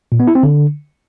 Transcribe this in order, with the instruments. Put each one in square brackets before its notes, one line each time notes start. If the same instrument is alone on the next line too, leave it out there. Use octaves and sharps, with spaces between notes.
[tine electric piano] A#2
B3
E4
C4
D3